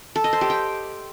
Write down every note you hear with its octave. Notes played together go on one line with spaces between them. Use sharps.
A4
D#5
C5
G4
G5